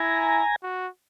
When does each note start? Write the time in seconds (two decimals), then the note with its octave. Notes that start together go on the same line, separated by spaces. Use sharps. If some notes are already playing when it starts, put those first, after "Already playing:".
Already playing: E4 G#5 A#5
0.63 F#4